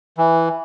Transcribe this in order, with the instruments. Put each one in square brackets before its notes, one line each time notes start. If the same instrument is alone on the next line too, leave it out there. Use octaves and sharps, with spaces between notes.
[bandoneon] E3